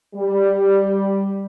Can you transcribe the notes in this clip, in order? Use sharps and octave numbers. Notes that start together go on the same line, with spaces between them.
G3